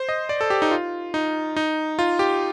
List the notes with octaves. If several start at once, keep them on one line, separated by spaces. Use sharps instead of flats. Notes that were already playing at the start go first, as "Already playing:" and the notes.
Already playing: C5
D#5
D5
A4
G4
D#4
F4
D#4
D#4
F4
G4